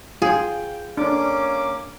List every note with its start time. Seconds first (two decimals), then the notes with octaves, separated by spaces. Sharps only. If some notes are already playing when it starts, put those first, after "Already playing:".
0.22 F4 G#4 G5
0.97 A#3 C#4 D4 D6